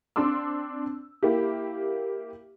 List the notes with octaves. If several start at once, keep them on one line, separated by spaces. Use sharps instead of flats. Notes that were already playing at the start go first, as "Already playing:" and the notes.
C4 D4 C6 D6 E6
A#3 E4 G4